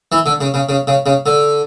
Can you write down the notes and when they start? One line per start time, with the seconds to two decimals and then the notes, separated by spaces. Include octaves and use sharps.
0.12 E3
0.26 D3
0.41 C#3
0.54 C#3
0.69 C#3
0.87 C#3
1.06 C#3
1.26 D3